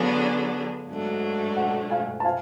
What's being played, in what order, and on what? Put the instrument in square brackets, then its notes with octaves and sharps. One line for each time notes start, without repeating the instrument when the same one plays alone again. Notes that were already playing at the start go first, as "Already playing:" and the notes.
Already playing: [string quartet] D3 F#3 B3 D4 G#4 [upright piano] F5 G#5
[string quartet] G#2 F#3 A3 D4
[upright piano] F#5
F5 G#5
A5
F5 G#5